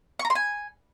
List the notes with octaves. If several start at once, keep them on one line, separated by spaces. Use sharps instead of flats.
C#6
A#5
C6
G#5